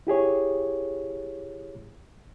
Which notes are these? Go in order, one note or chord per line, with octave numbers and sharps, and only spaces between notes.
E4 G4 G#4 C#5